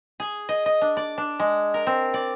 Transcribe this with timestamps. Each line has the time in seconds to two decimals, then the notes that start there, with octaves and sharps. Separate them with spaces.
0.20 G#4
0.49 D#5
0.66 D#5
0.81 D4
0.97 D5
1.18 D4
1.40 G#3
1.74 A#4
1.87 C4
2.14 D5